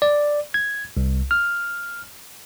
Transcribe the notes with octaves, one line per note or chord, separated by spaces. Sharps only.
D5
G#6
C2
F6